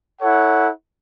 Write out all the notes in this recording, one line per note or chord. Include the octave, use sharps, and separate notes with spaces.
E4 A4 C#5 F#5